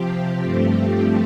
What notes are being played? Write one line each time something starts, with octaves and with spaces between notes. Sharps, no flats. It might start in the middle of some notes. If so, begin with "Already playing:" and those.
Already playing: C3 F3 C4 G4
G2 F3 A3 C4 G4